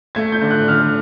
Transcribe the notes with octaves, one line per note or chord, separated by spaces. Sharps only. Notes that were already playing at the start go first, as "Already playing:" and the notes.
A3 G#6
G6
D3
F#6
D3 F6